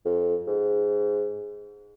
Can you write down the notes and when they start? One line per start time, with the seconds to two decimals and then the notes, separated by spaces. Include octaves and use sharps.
0.05 F2
0.47 G#2